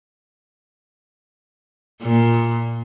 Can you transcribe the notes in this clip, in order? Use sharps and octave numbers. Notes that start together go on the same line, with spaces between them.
A#2